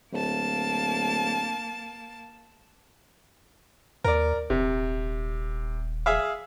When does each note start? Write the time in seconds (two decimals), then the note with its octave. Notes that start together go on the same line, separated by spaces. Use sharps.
0.13 D1 A#3 A5
4.04 D#2 A#4 D5
4.50 D#1 C3
6.06 G#4 E5 F5